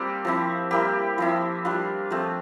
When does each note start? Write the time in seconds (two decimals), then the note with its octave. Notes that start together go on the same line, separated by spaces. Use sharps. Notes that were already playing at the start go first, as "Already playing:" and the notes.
Already playing: G3 A#3 C4 D4 F4 G4
0.25 F3 C4 E4
0.71 G3 A#3 E4 G4
1.18 F3 C4 E4
1.65 G3 D4 F4
2.10 F3 A3 C4